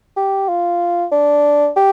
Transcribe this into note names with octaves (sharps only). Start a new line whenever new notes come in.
G4
F4
D4
G4